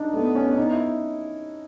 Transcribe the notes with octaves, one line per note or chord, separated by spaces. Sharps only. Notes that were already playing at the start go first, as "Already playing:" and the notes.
Already playing: D4 D#4
A3 B3
C#4
D4
D#4
E4